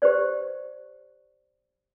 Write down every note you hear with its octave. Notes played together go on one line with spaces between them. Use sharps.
G4 B4 C5 D5